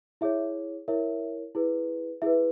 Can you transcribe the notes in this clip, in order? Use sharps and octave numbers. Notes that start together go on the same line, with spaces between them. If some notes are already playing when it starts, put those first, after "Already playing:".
E4 G#4 C#5 E5
E4 A#4 C#5 E5
E4 G#4 B4
E4 G#4 B4 E5